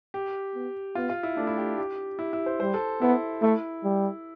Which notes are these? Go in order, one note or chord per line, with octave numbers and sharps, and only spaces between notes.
G4
B3
B3 F4
F4
E4
A3 D4
E4
G4
G4
E4
E4
C5
G3 C5
A4
B3 E4
A3 E4
G3